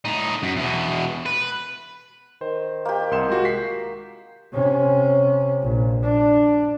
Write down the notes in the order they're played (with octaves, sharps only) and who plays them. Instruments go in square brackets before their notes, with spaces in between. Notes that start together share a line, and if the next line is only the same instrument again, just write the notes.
[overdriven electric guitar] A2 D#4
F#2
E2 B2
B4
[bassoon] D#3 [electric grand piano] C5
[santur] A#3 G4
[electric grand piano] C2 C6 E7
G#3 F4 F#4
B6 C7
[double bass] C3 C#4
A#1
D4